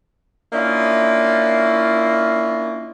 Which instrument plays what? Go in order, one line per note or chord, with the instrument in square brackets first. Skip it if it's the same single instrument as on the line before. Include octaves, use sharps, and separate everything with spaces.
[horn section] A#3 C#4 D4 E4 F4 D#5